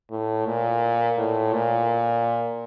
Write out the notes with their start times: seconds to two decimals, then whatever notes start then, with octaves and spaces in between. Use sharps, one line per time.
0.11 A2
0.46 A#2
1.18 A2
1.53 A#2